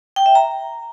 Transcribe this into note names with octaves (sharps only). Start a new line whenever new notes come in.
G5
E5
A#5